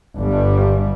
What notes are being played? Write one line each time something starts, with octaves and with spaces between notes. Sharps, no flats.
G1 G2 G3